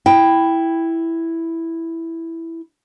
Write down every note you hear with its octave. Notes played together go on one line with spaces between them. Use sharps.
E4 G5